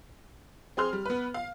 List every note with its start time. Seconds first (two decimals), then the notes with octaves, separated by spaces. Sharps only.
0.77 C4 G#4 C6 F6
0.93 G3
1.05 B3 B4
1.34 F5